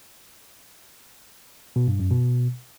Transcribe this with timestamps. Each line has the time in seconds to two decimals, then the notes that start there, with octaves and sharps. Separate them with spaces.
1.76 B2
1.88 G2
1.99 F#2
2.11 B2